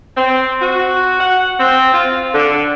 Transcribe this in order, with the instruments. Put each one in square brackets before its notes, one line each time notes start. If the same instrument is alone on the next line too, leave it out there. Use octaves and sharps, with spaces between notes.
[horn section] C4
F#4
F#5
C4
F4
D3